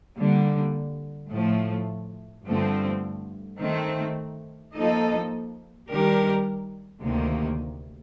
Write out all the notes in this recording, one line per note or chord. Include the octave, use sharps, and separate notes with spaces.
D3 G3 A#3
A2 F3 A3
G2 D3 F3 A3 C4
D#3 A3 C4
F3 A#3 D#4 A4 D#5
D#3 G3 D4 G4 A#4
D2 C3 D#3 A#3